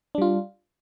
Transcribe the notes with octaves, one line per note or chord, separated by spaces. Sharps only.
G3 D4 F4